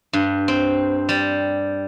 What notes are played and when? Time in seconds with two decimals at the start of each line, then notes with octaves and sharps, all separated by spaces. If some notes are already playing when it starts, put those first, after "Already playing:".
0.13 G2
0.48 C4
1.09 G3